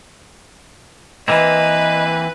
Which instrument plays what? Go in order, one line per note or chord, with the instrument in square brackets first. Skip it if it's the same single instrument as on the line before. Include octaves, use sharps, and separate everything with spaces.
[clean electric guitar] E3 A#3 C4 [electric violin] B4 [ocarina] D#5